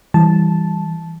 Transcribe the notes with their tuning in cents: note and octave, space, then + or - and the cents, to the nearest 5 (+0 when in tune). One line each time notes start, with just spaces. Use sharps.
E3 -5 G3 +0 A5 -10